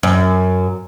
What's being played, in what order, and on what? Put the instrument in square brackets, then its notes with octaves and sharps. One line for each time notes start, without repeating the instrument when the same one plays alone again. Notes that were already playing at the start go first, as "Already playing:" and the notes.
[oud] F#2